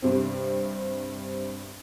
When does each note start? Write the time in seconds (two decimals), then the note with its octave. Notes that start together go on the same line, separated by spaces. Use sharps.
0.02 G2 C3 C4